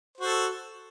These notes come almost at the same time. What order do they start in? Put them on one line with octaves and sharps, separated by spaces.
C5 F#4 A4